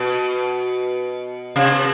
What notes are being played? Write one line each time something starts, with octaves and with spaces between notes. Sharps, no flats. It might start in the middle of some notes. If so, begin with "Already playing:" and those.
Already playing: B2
C3